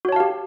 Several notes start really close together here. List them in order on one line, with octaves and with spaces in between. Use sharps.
F#4 C#5 A5 F5 G4